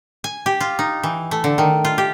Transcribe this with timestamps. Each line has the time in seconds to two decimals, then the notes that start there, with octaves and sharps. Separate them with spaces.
0.24 G#5
0.46 G4
0.60 F4
0.79 D#4
1.03 E3
1.31 A3
1.44 D3
1.58 D#3
1.85 F4
1.98 G4